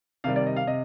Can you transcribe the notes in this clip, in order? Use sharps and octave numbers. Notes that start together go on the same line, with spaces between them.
C3 D#3 G3 F5
D5
D#5
F5
C3 D#5